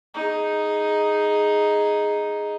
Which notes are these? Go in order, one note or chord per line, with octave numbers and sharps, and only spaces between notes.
D#4 G#4